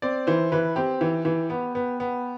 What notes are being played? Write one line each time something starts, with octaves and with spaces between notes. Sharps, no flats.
C4 D5
E3 C5
E3 B4
C4 G4
E3
E3
B3
B3
B3